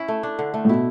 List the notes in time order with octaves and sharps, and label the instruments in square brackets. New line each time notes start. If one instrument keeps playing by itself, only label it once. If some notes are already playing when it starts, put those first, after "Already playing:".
Already playing: [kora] C#4 E4
A3
D4
D3
A3
[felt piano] A2
[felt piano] B2 [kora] E4